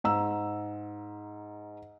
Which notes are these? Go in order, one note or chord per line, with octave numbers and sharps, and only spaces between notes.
G#2 A#5 E6